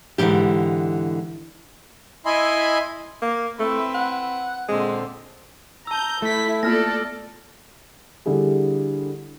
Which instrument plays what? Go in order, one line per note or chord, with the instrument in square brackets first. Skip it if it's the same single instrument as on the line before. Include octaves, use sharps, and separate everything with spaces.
[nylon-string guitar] G#2 D3 E3 F3 G4
[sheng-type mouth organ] E4 D#5 E5 G#5 B5 C6
[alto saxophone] A#3
[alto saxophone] A3 [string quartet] C4 E4 B4
[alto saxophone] F#5
[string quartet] A#2 D3 C4 [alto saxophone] G#3
[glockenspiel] A5 E6 [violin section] A#5 G6
[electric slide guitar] A3 [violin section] E4 B6
[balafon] A#3 B3 F4 [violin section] A4 D5 [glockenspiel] F6 A#6
[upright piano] D3 G3 D4 E4 G#4